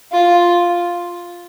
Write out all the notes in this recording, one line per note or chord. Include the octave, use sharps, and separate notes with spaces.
F4